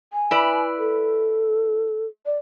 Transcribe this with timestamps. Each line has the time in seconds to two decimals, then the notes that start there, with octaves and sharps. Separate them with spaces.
0.13 G#5
0.31 E4 B4 D5
0.79 A4
2.26 D5